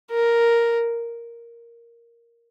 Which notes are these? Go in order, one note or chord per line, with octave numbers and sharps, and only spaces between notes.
A#4